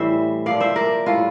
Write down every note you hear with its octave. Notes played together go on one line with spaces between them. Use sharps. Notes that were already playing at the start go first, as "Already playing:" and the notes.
Already playing: A2 E3 G3 C5 E5
A#2 F3 D5 F5
C5 E5
A#4 D5
A2 G3 F4 A4